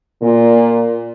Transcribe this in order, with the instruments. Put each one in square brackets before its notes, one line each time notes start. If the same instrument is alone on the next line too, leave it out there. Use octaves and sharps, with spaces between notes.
[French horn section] A#2